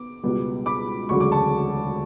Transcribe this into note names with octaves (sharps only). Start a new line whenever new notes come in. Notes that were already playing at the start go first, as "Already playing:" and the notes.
Already playing: B3 D6
C#2 B2 G3 B3
B5 D6
E1 D2 C#3 F#3 A3 C#6
D6
A5 C#6